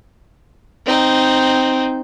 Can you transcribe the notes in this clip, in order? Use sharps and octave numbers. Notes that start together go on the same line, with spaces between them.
C4 D#4